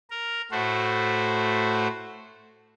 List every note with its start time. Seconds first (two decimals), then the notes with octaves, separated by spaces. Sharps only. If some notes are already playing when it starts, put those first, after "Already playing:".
0.10 A#4
0.51 A2 A3 F#4 C5